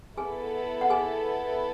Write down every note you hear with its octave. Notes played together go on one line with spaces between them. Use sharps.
B3 E4 G#4 A4 G#5
F#5
G#4 G#5